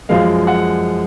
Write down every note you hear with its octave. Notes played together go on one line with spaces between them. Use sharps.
F#2 F3 G#3 F5
F#5